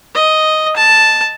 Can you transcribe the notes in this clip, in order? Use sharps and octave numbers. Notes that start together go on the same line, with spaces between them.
D#5
A5